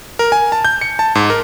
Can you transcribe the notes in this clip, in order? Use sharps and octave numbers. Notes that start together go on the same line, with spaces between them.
A#4
G#5
A5
G6
C#7
A5
G#2
A#4